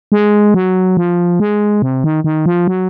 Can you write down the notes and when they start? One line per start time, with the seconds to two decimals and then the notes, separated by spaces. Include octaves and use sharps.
0.12 G#3
0.54 F#3
0.97 F3
1.40 G#3
1.82 C3
2.04 D#3
2.24 D#3
2.46 F3
2.67 F#3